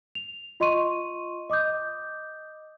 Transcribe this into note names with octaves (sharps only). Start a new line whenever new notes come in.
F7
F4 D#5 C6 C#6 D#7
D#5 D6 D#6 G6